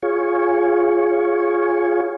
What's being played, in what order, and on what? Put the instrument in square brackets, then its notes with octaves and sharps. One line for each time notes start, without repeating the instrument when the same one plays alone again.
[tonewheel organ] F4 G#4 C#5